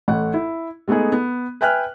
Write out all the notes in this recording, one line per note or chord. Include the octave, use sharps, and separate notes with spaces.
A1 A3 F#5
E4
G#3 A3 B3 D#4 G#4
B3
B4 E5 G5 G#5 F6 F#6